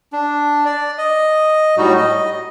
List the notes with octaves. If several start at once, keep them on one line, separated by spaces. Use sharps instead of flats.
D4
D5
D#5
A2 F#3 G3 D#4 F#4
D#5